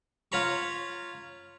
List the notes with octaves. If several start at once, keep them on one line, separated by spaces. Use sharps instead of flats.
F4 C#5 A#5 B5 C#6